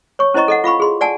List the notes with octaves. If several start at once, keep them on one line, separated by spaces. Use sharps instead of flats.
C#5 C#6
C#4 E4 C5 D#5 A#5 C#6
A4 D#5 F#5
F4 F5 B5 C#6
G#4 C6
D5 F#5 G#5 A5